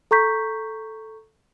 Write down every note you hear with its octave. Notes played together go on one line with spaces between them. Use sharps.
A4 A#5 C#6 G6 B6